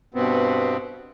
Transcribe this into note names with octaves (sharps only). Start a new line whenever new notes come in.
G2 B2 B3 C4